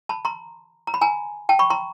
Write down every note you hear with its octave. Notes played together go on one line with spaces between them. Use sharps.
A5 B5
A#5 C6
A#5
B5
G#5 A#5
G5 A5
B5 C#6
A#5 C6